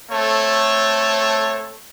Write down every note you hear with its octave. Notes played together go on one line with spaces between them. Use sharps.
A3 C4 A4 C#5